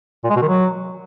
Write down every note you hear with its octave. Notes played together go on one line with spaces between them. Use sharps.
A#2
G#3
B2
D#3
F#3